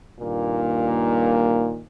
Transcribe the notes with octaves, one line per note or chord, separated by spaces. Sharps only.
G2 A#2 D#3 A#3